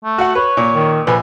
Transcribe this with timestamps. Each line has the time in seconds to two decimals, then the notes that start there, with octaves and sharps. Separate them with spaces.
0.04 A3
0.18 F#4 F#5
0.35 B4 C#5
0.57 A#2
0.73 D#3
1.07 A#1 B4 G#5